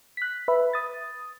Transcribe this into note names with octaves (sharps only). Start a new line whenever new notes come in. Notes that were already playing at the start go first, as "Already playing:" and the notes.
F#6 B6
B4 E5 B5
D#6 A6